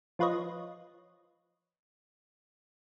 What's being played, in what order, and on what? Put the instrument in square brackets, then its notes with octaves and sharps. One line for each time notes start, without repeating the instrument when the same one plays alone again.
[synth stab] F3 F4 B4 C#5 D#5